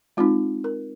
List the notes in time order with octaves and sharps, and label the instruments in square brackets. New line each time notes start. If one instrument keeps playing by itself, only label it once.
[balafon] G#3 C4 D#4 F4
A#4